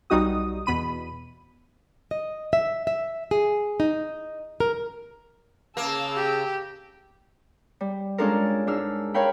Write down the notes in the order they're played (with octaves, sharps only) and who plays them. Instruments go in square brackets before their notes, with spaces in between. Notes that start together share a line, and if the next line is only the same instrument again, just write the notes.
[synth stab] B1 G3 D#4 F#4 D#6
E2 B2 B5 D#7
[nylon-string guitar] D#5
E5
E5
G#4
D#4
A#4
[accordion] C#3 [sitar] A#3 [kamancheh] A5 E6
[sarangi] G4
[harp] G3
G#3 C#4 D4 F4 A4 A#4
G#2 D4 E6 F6
A#4 C#5 F5 G5 B5